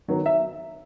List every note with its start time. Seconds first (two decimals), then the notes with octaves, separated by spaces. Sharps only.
0.08 D#3 F#3 B3
0.26 E5